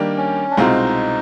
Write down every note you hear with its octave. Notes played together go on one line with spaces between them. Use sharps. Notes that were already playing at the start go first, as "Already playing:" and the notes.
Already playing: D#3 G3 A#3 D4 G4
C#4
D4
C2 B2 G#3 C4 D#4 F4